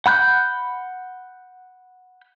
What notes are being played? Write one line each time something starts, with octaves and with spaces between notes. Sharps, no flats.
F#5 B5 F#6 G6